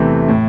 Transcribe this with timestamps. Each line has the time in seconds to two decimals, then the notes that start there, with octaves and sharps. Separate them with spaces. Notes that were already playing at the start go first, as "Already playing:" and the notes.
Already playing: E2 C3 E3 A3 C4
0.28 A2